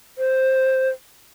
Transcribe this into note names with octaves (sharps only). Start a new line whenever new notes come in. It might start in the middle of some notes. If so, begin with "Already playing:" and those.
C5